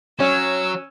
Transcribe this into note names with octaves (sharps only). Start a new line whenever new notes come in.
F#3 C#4 E6